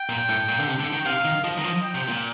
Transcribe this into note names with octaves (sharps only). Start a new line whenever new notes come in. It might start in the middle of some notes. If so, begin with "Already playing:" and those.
Already playing: G5
A#2
A2
A#2
D3
C3
D3
D#3
C3 F5
D#3
F3 D#5
D#3
F3
G5
C3
A#2